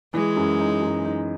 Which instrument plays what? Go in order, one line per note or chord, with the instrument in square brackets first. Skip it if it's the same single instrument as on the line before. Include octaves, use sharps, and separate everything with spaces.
[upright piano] E3 [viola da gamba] G#3
[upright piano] F#2
D#4
F#2
D#4